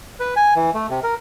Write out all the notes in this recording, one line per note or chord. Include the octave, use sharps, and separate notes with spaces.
B4
G#5
E3
A3
C3
A#4